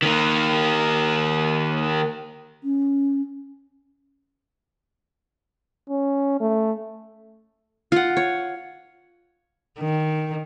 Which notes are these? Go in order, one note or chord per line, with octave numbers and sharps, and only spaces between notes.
D#3 A#3
C#4
C#4
A3
F4 F#5
C#5
D#3